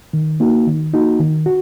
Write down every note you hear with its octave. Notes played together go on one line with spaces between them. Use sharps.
D#3
A#3 D#4 F#4
D#3
A#3 D#4 F#4
D#3
F#4